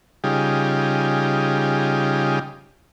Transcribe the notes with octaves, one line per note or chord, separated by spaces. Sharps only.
C#3 G3 D#4 F4 G4 G#4